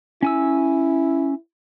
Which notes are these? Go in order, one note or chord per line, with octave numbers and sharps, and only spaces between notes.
C#4 E4 G#5 E6